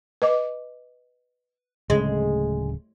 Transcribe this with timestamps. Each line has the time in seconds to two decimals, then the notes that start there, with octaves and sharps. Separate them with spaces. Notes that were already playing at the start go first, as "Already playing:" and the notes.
0.22 B4 D#5 D6
1.90 D1 C#3 G#3 A3